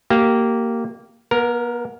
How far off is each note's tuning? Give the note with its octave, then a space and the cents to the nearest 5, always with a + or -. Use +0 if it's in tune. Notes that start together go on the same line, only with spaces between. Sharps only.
A#3 -10 G4 -20
B3 -45 A#4 +0